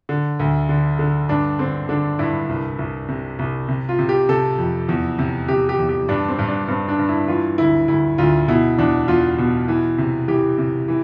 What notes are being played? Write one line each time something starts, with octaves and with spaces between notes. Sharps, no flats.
D3
D2
D3
D3
G2 D4
D3 C4
D3 D4
G2 E4
C2
C2
C3
C2
C3
F4
C3
G4
C3 A4
F2
E2
C3
C3 G4
G4
E2
G4
G2 D4
C4
G2
D4
G2 C4
D4
G2
E4
E3 F4
D2 E4
D2 E4
D2 F4
B2 E4
E2 D4
E2 F4
B2
E3
C3
E3 G4
C3
E3